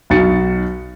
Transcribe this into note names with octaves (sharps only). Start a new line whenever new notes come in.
B1 D#4 F#4 A6 C#7